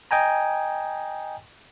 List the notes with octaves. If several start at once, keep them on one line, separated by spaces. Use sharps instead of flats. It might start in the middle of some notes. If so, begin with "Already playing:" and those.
D#5 G5 G#5 A#5